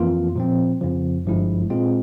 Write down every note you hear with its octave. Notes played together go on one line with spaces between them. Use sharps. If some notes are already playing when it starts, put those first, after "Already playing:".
Already playing: F2 E3 A#3 F4
A#2 F3 C4
F2 C#3 F3
G1 G2 F3 G#3 E4
A#2 G#3 C4 F4